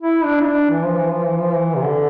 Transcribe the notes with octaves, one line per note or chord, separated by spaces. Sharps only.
E4
D4
E4
D4
E3
F3
E3
F3
E3
F3
E3
C3
D3